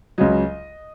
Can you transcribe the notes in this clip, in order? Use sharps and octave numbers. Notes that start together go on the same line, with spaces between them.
C#2 C#3 F#3 D#5